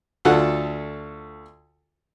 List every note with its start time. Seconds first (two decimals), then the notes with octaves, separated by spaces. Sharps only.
0.25 D2 F4 A4 F#5